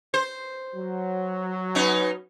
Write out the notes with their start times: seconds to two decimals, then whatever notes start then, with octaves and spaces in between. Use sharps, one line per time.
0.14 C5
0.75 F#3
1.75 B3 C#4 D#4